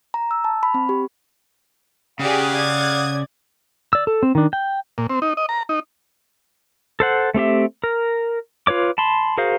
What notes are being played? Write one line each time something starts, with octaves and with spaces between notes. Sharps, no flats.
A#5
E6
A5
B5
C4
G4
C#3 G4 G#4 D5 F5 F#5 D#6
D5 G#6
D5 E6
A4
C4
D#3 D4
G5
A#2
C4
D#4
D#5
A#5
D#4
A4 C5 F#5
A3 C4 G4 E5
A#4
F4 B4 C#5 D6
A5 B5 C6
F#4 G#4 A#4 C5 F5